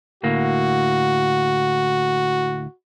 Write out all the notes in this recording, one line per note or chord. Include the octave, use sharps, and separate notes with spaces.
D2 A2 A#3 F#4